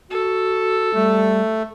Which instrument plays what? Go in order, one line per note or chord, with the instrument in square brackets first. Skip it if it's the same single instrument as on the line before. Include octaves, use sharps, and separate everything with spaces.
[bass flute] F#4 [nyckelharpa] A4
[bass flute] G3 [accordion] A3